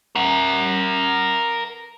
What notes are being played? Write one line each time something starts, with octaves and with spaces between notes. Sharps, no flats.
A#4 F#5